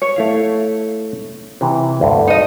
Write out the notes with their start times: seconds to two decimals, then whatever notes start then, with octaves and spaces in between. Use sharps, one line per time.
0.02 C#5
0.16 A3 E4 F5
1.61 C3 E3
2.01 D2 G2 D3
2.27 D#4 D#5